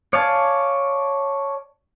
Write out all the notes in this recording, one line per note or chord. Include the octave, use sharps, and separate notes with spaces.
C#5 D5 F5 G#5 A5